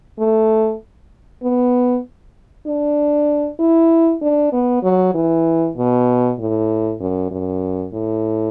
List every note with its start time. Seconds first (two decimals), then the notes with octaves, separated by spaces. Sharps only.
0.19 A3
1.43 B3
2.66 D4
3.59 E4
4.22 D4
4.53 B3
4.83 F#3
5.14 E3
5.77 B2
6.38 A2
7.01 F#2
7.31 F#2
7.93 A2